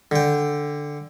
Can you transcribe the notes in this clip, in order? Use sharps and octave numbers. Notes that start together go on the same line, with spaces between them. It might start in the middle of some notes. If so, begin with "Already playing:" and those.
D3 G5